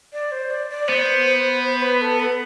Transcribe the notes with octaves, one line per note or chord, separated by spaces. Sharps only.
D5
C5
D5
D5
B3 C5
C5
C5
B4
A4
B4